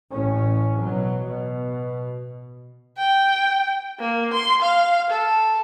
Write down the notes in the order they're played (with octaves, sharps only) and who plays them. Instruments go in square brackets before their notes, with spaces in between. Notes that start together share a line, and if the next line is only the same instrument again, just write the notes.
[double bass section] A1 A2 C#4
B2 F#3
B2
[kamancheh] G5
A#3
C6
F5
A4